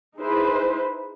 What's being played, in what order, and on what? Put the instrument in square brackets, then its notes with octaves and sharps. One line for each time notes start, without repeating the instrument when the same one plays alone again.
[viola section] D#4 E4 G#4 B4 C5